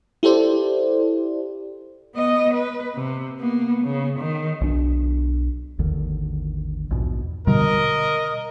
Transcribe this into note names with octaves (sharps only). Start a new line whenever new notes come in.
E4 G4 A4 C5 D5
B3 D#5
B4
C3
A#3 B3
C#3
D#3
B1 D4
G#1 D#2 D3 D#3
A#1 E2 G#2 B2
B2 D3 G3 A#4 D#5